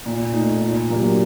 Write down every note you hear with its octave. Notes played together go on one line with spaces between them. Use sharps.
A#2
A3 D#4
A#2
F#3 A#3 D4 G4